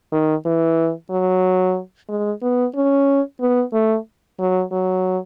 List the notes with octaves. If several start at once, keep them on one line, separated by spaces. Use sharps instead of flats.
D#3
E3
F#3
G#3
B3
C#4
B3
A3
F#3
F#3